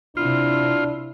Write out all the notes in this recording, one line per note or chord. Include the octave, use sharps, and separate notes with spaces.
C3 D4 E4 F4